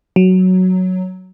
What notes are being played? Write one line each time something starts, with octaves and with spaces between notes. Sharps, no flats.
F#3